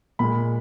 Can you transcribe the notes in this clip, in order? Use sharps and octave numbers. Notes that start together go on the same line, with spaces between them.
A#2 G#3 B5